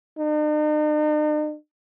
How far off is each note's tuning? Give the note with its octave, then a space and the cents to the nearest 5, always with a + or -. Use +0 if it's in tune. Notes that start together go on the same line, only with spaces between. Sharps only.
D#4 -45